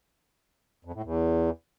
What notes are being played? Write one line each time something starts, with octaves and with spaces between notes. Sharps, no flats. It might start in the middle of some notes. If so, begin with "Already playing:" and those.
F2
A2
E2